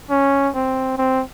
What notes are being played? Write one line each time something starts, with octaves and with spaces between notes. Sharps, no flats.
C#4
C4
C4